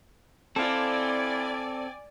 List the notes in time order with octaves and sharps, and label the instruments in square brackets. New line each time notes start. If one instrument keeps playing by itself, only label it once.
[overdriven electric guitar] C4 [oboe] E4 [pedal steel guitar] A4 F5 [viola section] D5 G#5